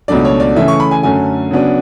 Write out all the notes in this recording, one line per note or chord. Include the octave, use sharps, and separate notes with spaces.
C#2 B2 F#3 A3 D4 D5
C#5
D5
C#3 E3 A3 E5
C#6
B5
G#5
F#2 D3 A3 C#4 G#5
C#3 F#3 B3 D4